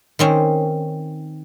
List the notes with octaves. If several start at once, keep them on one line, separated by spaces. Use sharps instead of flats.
D#3 C4 C#4